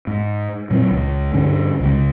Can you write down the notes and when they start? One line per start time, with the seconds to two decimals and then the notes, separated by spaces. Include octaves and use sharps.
0.07 G#2
0.71 A#2 F#3 A#3 C4
0.91 C#2
1.34 G2 D3 C#4
1.80 C#2 C#3 F3 G#3